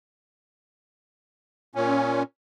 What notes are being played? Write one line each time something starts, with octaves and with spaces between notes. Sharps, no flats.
A#2 C#4